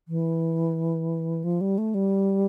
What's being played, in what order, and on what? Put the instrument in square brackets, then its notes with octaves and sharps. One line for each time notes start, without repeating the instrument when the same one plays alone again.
[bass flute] E3
F3
G3
A3
G3